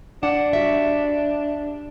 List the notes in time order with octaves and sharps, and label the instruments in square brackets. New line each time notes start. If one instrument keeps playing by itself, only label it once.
[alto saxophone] D4 [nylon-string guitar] F#5
[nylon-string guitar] G3 F#4 E5